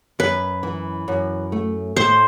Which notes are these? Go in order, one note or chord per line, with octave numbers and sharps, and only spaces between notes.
F#2 B4
E3
F#2
A3
A2 C5